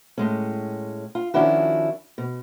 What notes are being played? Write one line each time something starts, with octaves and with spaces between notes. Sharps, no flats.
A2 G#3 C#4
F4
D#3 F3 C#4 D4 E4 F#4
B2